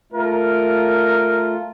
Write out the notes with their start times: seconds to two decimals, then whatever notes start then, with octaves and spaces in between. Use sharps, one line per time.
0.12 A3 F4 A#4